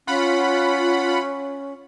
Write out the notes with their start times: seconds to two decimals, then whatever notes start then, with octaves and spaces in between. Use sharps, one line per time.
0.07 C#4 F4 F#5 B5